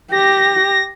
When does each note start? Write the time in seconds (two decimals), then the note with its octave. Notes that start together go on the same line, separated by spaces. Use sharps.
0.12 G4 A#6